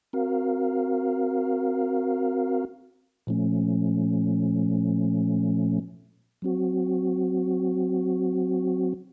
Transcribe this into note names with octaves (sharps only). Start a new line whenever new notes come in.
C4 F#4 A#4 F5
A#2 F3 A3 C#4
F#3 C4 F#4